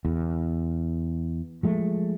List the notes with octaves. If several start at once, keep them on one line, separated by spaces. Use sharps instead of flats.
E2
F3 G#3 A3